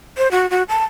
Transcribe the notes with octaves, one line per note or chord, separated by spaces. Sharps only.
C5
F#4
F#4
A5